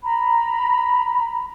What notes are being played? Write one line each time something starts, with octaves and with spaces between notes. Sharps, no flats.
A#5 B5